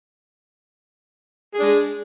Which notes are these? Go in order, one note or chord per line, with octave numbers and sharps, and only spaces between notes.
G#3 D4 G#4